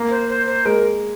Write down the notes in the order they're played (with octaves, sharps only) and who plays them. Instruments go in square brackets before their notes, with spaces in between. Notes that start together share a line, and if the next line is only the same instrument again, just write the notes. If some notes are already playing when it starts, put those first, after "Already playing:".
Already playing: [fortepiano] A#3
[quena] C5
C5
C5
[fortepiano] G#3 [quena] A#4